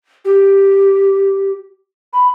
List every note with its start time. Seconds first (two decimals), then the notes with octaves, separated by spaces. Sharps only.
0.25 G4
2.13 B5